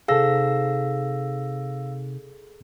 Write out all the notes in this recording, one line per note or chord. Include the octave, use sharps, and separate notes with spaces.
C3 D#4 G#4 A4 C5 F5 E6 A#6